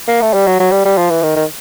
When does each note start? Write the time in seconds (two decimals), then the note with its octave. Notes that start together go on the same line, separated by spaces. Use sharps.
0.08 A#3
0.22 A3
0.34 G3
0.47 F#3
0.60 F#3
0.72 G3
0.85 G3
0.98 F3
1.10 E3
1.23 D#3
1.36 D#3